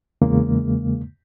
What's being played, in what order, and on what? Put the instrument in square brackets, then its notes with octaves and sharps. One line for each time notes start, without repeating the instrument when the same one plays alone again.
[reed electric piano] E2 C#3 G#3 A#3